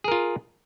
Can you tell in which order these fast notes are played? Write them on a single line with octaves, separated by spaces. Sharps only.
G#4 A#4 F4